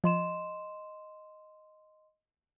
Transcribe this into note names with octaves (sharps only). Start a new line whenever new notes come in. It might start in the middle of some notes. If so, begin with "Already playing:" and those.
F3 D#5 C6 E7